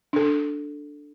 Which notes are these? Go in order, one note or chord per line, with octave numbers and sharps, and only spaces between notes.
D4 A4